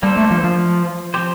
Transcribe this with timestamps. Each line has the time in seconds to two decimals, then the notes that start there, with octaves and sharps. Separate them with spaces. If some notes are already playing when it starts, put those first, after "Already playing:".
0.03 G3 A#3 D4 A4 C5
0.17 A3
0.31 F3
0.44 F3
1.14 F3 C4 G4 C5